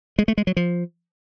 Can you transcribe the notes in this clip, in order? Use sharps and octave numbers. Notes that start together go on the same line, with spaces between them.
G#3
A3
G#3
F#3
F3